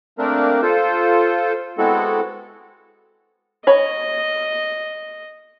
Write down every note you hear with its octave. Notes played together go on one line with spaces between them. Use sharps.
A3 A#3 C4 D4 A#4
F4 A4 C5
G#3 B3 C4 E4 F#4 A4
C#5 D#5 B5